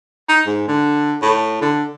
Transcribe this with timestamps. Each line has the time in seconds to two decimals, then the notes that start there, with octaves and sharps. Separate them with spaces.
0.29 D#4
0.47 G#2
0.68 D3
1.22 A2
1.62 D3